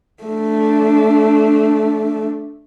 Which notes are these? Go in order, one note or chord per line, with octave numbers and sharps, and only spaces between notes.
A3 D4